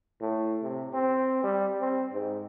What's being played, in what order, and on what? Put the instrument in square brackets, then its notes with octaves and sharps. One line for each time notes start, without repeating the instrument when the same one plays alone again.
[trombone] A2
C3
C4
G3
C4
G#2